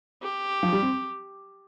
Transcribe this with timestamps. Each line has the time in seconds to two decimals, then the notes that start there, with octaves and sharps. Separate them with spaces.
0.22 G4
0.63 F3
0.73 G3
0.82 C4